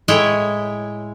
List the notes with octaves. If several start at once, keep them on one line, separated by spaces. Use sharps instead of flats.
A2 G#3 E4 G#4 C#5 G5